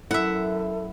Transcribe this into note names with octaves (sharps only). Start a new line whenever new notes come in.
F#2 E4 A4 E5 F#5